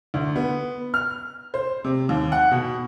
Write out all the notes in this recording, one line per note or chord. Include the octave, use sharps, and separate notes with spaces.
D2
B3
F6
C5
C3
D#2
F#5
B2